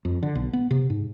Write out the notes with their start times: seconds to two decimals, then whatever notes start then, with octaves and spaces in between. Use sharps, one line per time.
0.05 F2
0.23 D3
0.35 B1
0.53 B3
0.71 C3
0.90 G#2